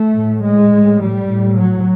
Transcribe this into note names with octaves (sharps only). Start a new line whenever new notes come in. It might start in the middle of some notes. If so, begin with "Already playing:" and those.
Already playing: A3
A2
G#3
A2
G3
A2
F#3